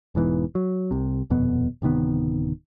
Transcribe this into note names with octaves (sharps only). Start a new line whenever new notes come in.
E1 G#2 E3 B3
F#3
C2 C3
D#1 F2 B2 B3
D1 C3 D#3 B3